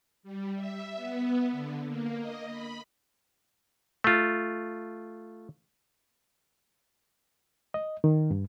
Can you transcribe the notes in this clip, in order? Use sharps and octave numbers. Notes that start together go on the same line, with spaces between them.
G3
E5
B3
D3
A#3
D#5
B5
A3 F4
D#5
D#3
G2